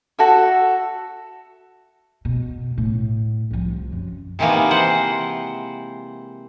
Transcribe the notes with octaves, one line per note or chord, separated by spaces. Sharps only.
F#4 A4 E5
B2
A2
C2 F3
F#2
C3 D#3 E3 G#3 A#3 B3
E3 C5 F#5